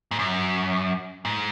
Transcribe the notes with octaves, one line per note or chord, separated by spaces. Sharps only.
G#2
F#2
G#2